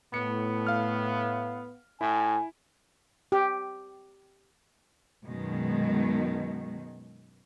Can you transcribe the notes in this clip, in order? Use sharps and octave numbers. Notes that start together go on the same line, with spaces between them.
A2 B3 C#7
F5 F6
A2 E4 G#5
G4
F#2 B2 D#3 G#3